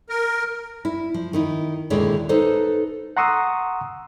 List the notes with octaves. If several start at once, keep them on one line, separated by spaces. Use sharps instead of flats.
A#4
E4
F3
D#3 D#4 E4
D#2 A#2 D3 G#3 E4 C#5
D#4 A4 B4 C5
F#5 A#5 C6 C#6 D#6 E6